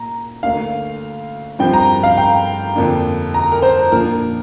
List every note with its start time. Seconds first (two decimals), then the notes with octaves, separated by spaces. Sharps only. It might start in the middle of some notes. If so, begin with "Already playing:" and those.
Already playing: A#2 A#5
0.43 D2 D3 A#3 D4 F5
1.59 G2 F3 C4 G5
1.73 A#5
2.03 F5
2.17 G5
2.75 F2 D3 A#3 D4
3.34 A#5
3.52 A#4
3.62 C5
3.91 A#2 F3 A#3 D4 A#4